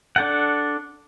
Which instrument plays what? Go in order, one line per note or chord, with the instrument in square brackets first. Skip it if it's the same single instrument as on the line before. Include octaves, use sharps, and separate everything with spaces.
[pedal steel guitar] D4 A4 F#5